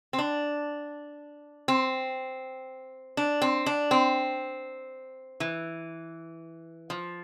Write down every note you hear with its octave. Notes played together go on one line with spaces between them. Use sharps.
C4
D4
C4
D4
C4
D4
C4
E3
F3